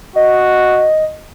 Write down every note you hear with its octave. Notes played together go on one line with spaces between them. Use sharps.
F#4 D#5